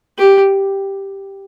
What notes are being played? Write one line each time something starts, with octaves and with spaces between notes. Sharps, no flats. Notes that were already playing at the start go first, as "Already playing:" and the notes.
G4